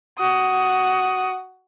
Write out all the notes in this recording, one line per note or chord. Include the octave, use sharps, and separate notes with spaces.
F#4 D#6